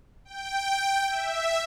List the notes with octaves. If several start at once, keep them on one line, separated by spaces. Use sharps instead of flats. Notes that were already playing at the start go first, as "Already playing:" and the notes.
G5
E5